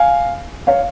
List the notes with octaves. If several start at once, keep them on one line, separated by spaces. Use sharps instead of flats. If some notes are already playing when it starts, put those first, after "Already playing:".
Already playing: F5 G#5
C#5 F5